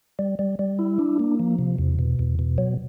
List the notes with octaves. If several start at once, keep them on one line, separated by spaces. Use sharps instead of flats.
G3
G3
G3
E4
D4
A#3
F3
C3
E2
B2
E2
B2
F#3